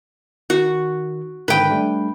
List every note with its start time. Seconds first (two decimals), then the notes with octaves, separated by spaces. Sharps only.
0.50 D#3 F#4
1.48 G#2 D3 D#3 B4 G5
1.70 G3 A3 D4